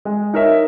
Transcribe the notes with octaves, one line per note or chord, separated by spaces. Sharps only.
G#3
D#4 A#4 C#5 E5